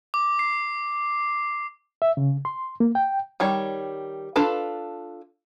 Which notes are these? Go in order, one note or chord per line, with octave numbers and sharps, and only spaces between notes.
D6
C7
E5
C#3
C6
A#3
G5
D#3 G3 C#5
D4 F4 A4 B4